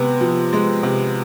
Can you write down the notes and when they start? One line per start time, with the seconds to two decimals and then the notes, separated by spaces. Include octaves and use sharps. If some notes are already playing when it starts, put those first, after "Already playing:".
Already playing: C3 G#3 B3
0.21 F3
0.53 G#3
0.83 C3